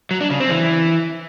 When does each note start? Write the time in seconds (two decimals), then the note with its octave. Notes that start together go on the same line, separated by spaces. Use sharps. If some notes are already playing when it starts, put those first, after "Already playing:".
0.11 F#3
0.21 D4
0.30 C#3
0.40 C4
0.50 E3